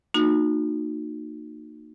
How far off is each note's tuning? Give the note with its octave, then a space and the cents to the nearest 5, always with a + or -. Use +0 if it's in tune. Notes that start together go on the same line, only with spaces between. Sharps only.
A#3 -15 D#4 -30 F#4 -35